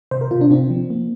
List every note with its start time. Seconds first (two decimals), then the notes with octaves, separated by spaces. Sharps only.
0.11 C3 C5
0.21 A#4
0.31 C3 F4
0.41 D4
0.51 C3 C4
0.70 F3
0.90 A#3